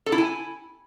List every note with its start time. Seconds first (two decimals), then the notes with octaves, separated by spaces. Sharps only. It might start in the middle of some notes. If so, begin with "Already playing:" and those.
0.06 A4
0.12 E4
0.18 G#5